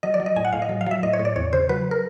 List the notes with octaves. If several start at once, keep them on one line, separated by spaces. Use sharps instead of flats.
F#3 D#5
D5
F#3
D#5
A2 G#5
F#5
A2 F5
D#5
F#3
F5
F#3 E5
A2 D#5
C#5
A2
D5
E2 C#5
C#3 C5
F#3 B4
A#4